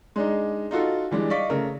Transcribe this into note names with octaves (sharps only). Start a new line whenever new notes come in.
G#3 D4 D#4
D#4 F4 F#4 A4
E3 G3 G#3 D4
D5 D#5 F5 C#6 B6
C#3 A3 A#4